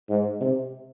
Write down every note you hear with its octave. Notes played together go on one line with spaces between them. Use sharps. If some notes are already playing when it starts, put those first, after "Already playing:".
G#2
C3